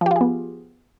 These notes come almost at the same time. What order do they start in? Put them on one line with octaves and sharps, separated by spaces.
F3 G4 F4 G#4 B3